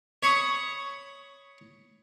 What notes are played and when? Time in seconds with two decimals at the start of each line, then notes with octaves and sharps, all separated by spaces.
0.23 C#5 B5 C#6 D#6